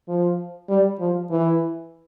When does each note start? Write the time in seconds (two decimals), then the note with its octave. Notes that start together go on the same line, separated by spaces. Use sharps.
0.08 F3
0.69 G3
1.00 F3
1.30 E3